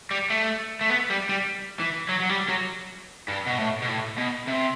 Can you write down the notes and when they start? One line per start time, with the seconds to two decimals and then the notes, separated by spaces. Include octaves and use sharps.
0.11 G3
0.30 A3
0.81 A3
0.90 B3
1.10 G3
1.29 G3
1.80 E3
2.09 F#3
2.20 F#3
2.29 G3
2.49 F#3
3.28 G2
3.47 B2
3.58 A2
3.82 B2
3.88 A2
4.18 B2
4.47 C3